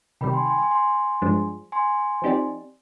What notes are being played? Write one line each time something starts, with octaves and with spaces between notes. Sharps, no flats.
C3 D#3 G3 G5 B5
G#5 C6
G#5 C6
G#5 C6
G#5 C6
G2 F3 G#3 D4
G#5 C6
F3 C4 D#4 G4 D5